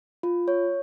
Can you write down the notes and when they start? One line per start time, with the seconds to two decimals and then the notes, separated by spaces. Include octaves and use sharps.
0.23 F4
0.48 C#5